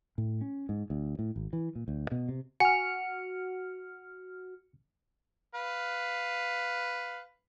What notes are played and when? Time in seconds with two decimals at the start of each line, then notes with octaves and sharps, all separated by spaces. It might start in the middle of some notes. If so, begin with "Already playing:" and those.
0.18 A2
0.41 C#4
0.69 G#2
0.90 D2
1.19 A2
1.36 G#1
1.53 E3
1.75 A#2
1.88 D2
2.12 B2
2.29 C3
2.60 F#4 G#5 F6 C#7
5.55 B4 F5